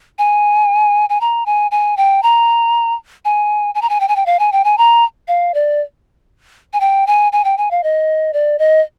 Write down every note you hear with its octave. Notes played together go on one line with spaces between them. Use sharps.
G#5
G#5
A#5
G#5
G#5
G5
A#5
G#5
G#5
A#5
G#5
G5
G#5
G5
F5
G#5
G5
G#5
A#5
F5
D5
G#5
G5
G#5
G#5
G5
G#5
F5
D#5
D5
D#5